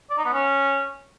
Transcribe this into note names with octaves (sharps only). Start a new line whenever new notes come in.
D5
D#4
B3
C#4